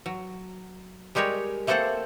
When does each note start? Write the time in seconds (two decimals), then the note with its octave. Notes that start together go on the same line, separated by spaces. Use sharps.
0.06 F#3
1.15 G3 G#3 G4 A#4 C#5
1.67 A3 A#3 C4 A4 C5 F#5